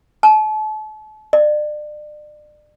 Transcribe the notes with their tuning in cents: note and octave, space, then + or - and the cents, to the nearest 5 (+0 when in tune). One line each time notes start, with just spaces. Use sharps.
A5 -40
D5 +35